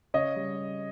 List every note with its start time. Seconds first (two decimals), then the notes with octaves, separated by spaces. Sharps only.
0.14 C#3 C#5 D#5
0.36 G3